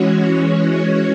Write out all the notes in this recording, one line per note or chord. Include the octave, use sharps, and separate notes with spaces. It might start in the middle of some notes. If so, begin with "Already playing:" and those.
Already playing: E3 G#3 C#4 F#4 C#5
F#4